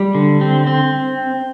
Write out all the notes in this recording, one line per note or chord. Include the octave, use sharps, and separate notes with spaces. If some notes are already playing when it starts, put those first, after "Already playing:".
Already playing: G3
D3
C4
C4